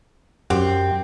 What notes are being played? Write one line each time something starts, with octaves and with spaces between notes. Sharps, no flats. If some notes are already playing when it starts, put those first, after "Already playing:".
F#2 C4 G4 F#5